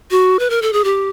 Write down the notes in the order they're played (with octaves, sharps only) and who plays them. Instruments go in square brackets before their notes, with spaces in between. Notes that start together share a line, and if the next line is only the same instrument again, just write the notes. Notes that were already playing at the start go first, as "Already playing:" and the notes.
[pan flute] F#4
B4
A#4
A4
G#4
G4